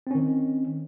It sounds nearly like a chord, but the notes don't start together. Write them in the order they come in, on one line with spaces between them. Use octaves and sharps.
C4 C#4 D#3